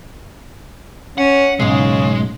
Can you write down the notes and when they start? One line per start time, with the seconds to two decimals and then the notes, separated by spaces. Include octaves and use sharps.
1.18 C#4 F#5
1.60 B1 G#2 C#3 G#3